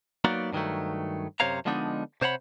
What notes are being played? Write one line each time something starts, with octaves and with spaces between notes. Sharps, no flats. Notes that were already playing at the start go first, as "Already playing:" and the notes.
F#3 A#3 B3 D#4 F#4 D5
G2 D#3 F#3 A3
F#2 C3 C5 C#5 F5 A#5
D3 F3 G#3 B3 D4 D#4
C3 C5 C#5 F#5 B5